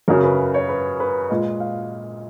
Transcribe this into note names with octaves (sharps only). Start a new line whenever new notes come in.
F#2 C#3 F#3 A#4
B4
C#5
B4
B4
A#2 G#3 D#5
F5